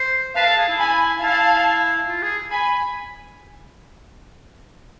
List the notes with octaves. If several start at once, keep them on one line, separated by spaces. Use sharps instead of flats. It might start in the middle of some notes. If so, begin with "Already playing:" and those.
Already playing: C5
B4 F5 A5
A4
G#4
E4
G#5 B5
E4 F5 A5
F4
G#4
G#5 B5